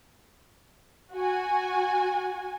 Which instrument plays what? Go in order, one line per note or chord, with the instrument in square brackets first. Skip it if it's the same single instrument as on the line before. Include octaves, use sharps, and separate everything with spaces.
[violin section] F#4 G#5